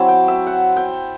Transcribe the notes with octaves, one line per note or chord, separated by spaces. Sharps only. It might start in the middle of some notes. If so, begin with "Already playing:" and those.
Already playing: F#3 C4 E4 A5
G5
E5
F#5
G5